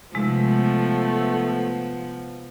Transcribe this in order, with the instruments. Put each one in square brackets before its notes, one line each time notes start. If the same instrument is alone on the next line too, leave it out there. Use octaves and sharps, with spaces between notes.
[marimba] C3 G#3 D#4 [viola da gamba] F3 B3 [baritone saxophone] A3